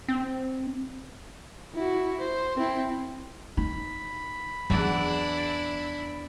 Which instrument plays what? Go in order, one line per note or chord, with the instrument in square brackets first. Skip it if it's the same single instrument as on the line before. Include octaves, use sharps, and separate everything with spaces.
[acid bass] C4
[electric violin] E4 F#4
C5
C4 E4
[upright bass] D#4 [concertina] B5
[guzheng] E2 E3 [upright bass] F#3 [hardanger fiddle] D4 E4